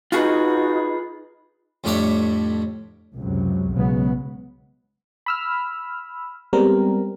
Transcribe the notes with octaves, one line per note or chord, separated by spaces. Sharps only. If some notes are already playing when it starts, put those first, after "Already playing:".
D#4 F4 F#4 G#4 B4
F2 A2 G3 D4 C#5 E5
C#2 F#2 C3 F#3
B1 C#3 F#3 G#3 B3
B5 E6 F6
G3 G#3 B3 C4 A#4